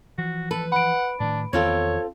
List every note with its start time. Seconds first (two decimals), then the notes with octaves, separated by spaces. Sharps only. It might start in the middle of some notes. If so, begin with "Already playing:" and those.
0.18 E3 F3 F#4
0.51 A4 B4
0.72 F#5 B5 D7
1.20 A2 D#3 D4
1.53 E2 D#3 B3 C4 F4 A4 C#5